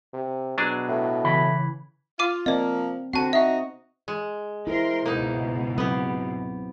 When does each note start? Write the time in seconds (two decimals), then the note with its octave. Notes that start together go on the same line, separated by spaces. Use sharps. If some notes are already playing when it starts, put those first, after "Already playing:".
0.13 C3
0.58 B2 F#3 D4 G#4
0.88 A2
1.24 C#3 E3 B5
2.19 F4 F5 D6 D#7
2.46 F3 A#3 C4 D5 D#5
3.13 D3 C4 F#4 F#5 A5
3.33 D#4 F#4 D#5 E5 F#5
4.08 G#3
4.67 E4 A#4 C5 C6
5.06 C#2 G#2 B2 A#3 D#4
5.78 F#3 B3 C4 G4